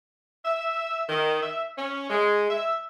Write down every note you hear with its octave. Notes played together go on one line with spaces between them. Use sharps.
E5
D#3
E5
C#4
G#3
E5